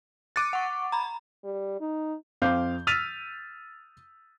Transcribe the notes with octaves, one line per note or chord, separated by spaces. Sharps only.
D6 F#6 A6 C#7 D#7
F#5 C#6
A#5 B5
G3
D#4
F2 C4 F5 D6 G6
E6 F6 A6 B6 D#7 F7